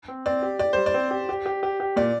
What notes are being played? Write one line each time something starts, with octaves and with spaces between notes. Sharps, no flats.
C4
C4 D5
G4
G4 D5
G3 C5
D5
C4
G4
G4
G4
G4
G4
A#2 D5